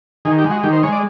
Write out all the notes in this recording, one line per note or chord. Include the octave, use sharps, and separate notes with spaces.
D#3 G#4
G4
G#3
F#4
D#3 G4
C5
G#3 C#5
D5